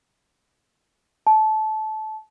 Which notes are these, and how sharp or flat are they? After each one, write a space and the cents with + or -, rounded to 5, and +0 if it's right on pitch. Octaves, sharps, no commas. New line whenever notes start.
A5 -20